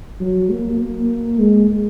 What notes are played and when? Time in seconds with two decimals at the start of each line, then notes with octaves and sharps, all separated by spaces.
0.20 F#3
0.50 A#3
0.80 A#3
1.39 G#3